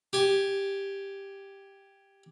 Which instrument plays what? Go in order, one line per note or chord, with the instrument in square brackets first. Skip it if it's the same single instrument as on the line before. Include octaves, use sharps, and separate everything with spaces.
[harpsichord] G4 G#5